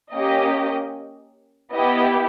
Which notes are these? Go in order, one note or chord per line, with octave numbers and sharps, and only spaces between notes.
A#3 C#4 G4 D#5
B3 E4 G4 D#5